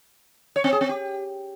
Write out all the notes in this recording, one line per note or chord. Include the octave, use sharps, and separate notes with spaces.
C#5
C4
G#4
C4
G4